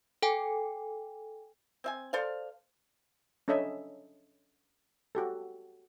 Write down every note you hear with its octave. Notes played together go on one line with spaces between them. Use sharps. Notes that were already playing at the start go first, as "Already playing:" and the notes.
A4 G5 G#5
C4 E5 G#5
A4 C5 D5 F5
C#4 D4 A4 C#5 D#5 E5
F#4 G4 A4